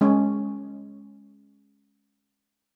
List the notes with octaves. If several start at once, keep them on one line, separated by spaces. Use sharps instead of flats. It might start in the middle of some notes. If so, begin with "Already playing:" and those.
G#3 C#4